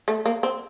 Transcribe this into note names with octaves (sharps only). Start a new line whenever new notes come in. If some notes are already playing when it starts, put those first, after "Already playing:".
A3
A#3
C4